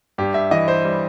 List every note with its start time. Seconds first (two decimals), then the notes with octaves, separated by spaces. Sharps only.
0.18 G2 G4
0.34 E5
0.51 E3 D#5
0.68 C5
0.85 G3